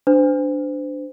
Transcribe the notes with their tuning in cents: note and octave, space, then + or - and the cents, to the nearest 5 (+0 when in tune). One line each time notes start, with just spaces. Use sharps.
D4 +0 C5 -35